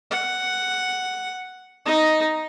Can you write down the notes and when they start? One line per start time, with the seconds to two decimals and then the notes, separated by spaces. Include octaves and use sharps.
0.11 F#5
1.85 D#4 D#5